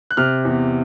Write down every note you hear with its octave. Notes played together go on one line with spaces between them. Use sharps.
F#6
C3 F6
E2